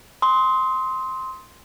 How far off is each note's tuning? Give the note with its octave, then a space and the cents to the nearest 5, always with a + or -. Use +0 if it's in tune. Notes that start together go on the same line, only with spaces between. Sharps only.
C6 +0 D#6 +35